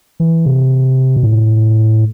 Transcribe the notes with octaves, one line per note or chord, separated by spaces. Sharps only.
E3
C3
B2
A2